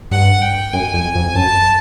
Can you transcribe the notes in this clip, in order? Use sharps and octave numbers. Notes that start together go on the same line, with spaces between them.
G2 F#5
G5
F#2 G#5
F2
F2
F#2 A5